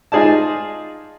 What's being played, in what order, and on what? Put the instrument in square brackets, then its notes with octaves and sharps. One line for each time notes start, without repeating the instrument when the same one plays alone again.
[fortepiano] D#4 F4 G#4 D5 A5